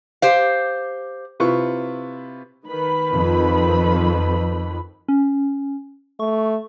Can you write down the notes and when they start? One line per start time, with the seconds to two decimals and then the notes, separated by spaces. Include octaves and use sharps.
0.22 G4 C5 F5
1.40 C3 E4 F4 B4 C#6
2.68 D#3 B4 B5
3.13 F2
5.08 C#4
6.20 A3 C#6